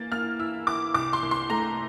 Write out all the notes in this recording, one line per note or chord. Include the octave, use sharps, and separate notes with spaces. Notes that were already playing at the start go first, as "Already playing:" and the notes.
Already playing: E3 A#3 A6
A#3 F6
E4 E6
E4 D6
C2 D6
C6
C2
C6
A3 A#5